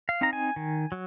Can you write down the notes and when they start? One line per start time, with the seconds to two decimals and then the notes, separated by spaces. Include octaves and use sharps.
0.09 F5
0.21 C4 D#4 A#5
0.33 G#5
0.56 D#3
0.92 F#3